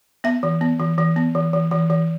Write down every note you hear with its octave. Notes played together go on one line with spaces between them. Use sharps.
B3 E5
E3
B3
E3
E3
B3
E3
E3
E3
E3